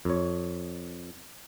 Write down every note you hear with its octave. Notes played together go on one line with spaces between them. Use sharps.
F2 C#5